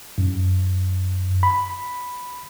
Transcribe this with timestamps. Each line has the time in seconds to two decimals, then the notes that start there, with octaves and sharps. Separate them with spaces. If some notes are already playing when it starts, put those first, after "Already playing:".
0.18 F#2
1.43 B5